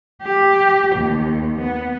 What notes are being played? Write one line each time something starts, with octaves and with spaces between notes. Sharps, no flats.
G4
D#2
B3